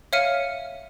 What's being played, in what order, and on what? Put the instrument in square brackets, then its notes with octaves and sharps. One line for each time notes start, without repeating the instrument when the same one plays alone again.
[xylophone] C#5 E5 F5 F6 C#7 D#7